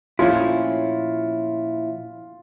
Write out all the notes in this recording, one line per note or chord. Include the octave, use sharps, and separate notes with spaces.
A#2 F3 A3 C#4 E4 F4